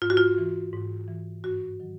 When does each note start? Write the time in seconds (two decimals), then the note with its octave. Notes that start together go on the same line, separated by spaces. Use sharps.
0.02 G#2 F4
0.10 F#4
0.17 F4
0.38 E3
0.73 G#2
1.08 E3
1.44 G2 F#4
1.80 D#3 F#3